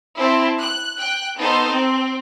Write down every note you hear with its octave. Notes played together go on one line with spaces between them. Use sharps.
C4 E4 A5
F#6
G5 F#6
B3 D#4 A4 C5
C4